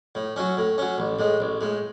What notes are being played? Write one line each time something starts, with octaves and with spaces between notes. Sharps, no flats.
A2
F#3 C#4
A2
F#3 C#4
A1
A2 G#3
A1
A2 G#3